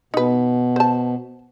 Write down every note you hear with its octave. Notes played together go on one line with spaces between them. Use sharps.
B2 D#4 B4
C5 A5